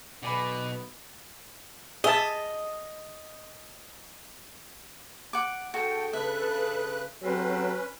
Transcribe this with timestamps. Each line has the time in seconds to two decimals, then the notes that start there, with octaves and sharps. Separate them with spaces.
0.23 B1 B2 B3 D5 G#5 B5
2.04 G#4 D#5 E5 A5
5.33 F#5 D6
5.74 D4 F#4 G#4 A4 G5
6.13 C#3 B4 E5 F#6
7.24 C3 F#3 A3 C4 C#4 B4